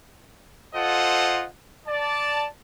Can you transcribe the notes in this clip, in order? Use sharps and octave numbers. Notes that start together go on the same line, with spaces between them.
F4 A4 C5 D#5 F#5
D5 A5